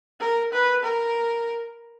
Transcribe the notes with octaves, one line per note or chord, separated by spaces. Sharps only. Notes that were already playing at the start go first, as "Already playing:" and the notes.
A#4
B4
A#4